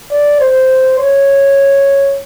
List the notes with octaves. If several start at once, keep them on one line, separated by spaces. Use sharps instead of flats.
D5
C5
C#5